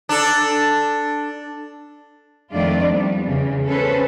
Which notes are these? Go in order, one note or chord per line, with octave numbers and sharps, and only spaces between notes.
D4 A4
F2 D#3 A3 D4 F4 D5
G3 B3
E2 C#3
C#4 A4 B4 C5